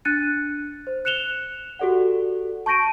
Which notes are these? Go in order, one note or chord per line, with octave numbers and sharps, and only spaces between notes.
D4 F#6 A6 C#7 D#7
C5
F#6 C#7 E7 F7 G7
F#4 G4 A4 D5 F#5
A5 C#6 G6 A#6 D7 D#7